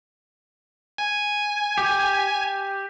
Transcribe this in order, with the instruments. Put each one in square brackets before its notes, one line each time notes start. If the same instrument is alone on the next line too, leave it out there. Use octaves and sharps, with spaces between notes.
[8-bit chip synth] G#5
[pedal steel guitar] G4